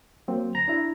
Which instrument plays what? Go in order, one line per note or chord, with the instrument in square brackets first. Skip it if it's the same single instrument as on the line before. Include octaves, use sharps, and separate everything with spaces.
[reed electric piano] F#3 A#3 C4
[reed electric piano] D2 [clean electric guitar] A#5
[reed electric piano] D4 E4